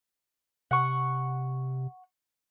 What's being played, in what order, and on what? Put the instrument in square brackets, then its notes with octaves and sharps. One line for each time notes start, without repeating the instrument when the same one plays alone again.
[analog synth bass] C3 [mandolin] F#5 C#6